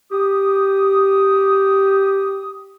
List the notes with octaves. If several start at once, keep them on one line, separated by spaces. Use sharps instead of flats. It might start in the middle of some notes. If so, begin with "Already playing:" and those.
G4 D#6